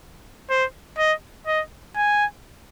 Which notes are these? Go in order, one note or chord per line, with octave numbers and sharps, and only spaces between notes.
C5
D#5
D#5
G#5